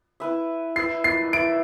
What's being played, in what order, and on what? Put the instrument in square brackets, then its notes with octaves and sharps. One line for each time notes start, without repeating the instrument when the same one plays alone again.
[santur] E4 B4 E5
[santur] E4 B4 E5 [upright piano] C7
[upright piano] C7
[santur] E4 B4 E5 [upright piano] D7